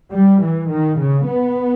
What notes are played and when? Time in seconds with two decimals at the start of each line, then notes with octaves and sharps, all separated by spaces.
0.13 G3
0.42 E3
0.70 D#3
0.99 C#3
1.28 B3